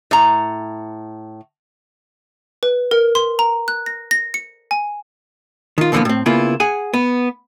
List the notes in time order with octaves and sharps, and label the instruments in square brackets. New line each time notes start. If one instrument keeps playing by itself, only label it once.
[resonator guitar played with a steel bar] A2 A#5
[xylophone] B4
A#4
C6
A#5
F#6
A#6
A#6
C#7
G#5
[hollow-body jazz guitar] D#3 F4
A#2 D3 E3 F3 A#3 B3
A2 C4
C#3 A#3 B3 E4 F4
G#4 F#5 G#5
B3